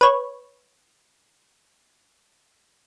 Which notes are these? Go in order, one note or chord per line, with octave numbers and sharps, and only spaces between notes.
B4 C#5